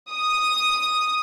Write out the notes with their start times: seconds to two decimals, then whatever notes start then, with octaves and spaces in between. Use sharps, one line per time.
0.11 D#6